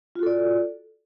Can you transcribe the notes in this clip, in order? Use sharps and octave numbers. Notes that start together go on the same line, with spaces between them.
F4 F#4 A4 D5